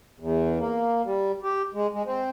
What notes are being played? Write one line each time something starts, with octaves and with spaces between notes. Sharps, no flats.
E2
A#3
G3
G4
G#3
G#3
C4